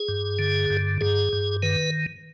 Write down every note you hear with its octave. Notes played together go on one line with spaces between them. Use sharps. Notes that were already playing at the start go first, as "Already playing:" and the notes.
Already playing: G#4
G2
D3
G2
G2 G#4
G2
D#3 B4